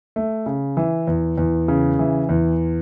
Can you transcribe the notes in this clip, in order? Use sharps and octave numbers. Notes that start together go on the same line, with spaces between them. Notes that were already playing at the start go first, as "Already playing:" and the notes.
A3
C#3
E3
E2
E2
C#3
E3
E2